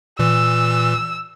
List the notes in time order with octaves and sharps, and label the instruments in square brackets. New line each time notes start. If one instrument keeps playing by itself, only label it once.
[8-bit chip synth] A#2 E3 [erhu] E6